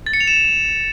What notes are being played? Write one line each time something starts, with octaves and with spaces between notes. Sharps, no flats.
A6
C#7
F7
E7